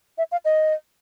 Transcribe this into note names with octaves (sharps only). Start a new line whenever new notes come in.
E5
F5
D#5